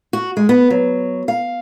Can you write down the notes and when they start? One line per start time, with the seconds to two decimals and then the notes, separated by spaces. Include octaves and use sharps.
0.13 F#4
0.37 G#3
0.49 B3
0.70 F#3
1.28 F5